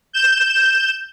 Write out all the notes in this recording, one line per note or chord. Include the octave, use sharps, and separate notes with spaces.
G6 E7